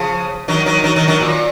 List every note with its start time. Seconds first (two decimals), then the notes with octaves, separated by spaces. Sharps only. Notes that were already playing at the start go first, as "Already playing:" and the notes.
Already playing: C#3 F3
0.48 D#3 F#3
0.66 D#3 F#3
0.84 D#3 F#3
0.96 D#3 F#3
1.08 D#3 F#3
1.20 A#2